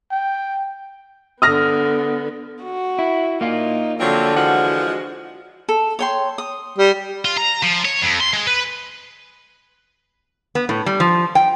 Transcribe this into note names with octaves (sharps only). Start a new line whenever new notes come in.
G5
D3 B3 D#6 F6 A#6
F#4
E4
A#3 D#4 F4
D3 F3 F#3 C4
E3 F3 G#3 F#4
A4
C#5 G5 C6
D#6
G3
F4
A#5
F3
C#5
F2
C6
G#3
B4
B3
A2
G3
F3
G5